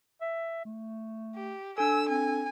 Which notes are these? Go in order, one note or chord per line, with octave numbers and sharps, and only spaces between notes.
E5
A3
G4
D4 A4 G#5 E6
C4 G#5